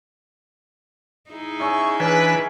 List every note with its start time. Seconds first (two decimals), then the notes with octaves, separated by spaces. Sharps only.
1.31 D#4 E4 G#4
1.60 C#4 E5 C#6
2.00 E3 C#4 D4 B4 G#5 B5